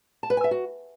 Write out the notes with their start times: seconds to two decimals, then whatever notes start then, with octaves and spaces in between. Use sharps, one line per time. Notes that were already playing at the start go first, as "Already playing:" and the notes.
0.23 A5
0.30 B4
0.37 G#5
0.44 E5
0.51 F#4